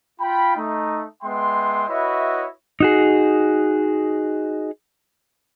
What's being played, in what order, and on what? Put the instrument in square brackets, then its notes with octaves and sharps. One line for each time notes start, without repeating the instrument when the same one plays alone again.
[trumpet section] F4 G5 B5
A3 D#4
G#3 B3 E5 G5 C6
E4 F#4 B4 C#5 D#5 E5
[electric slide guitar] D#4 F#4 G#4